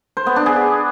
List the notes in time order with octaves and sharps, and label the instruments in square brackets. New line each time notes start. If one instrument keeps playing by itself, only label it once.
[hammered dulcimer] C5
B3
D4
G#4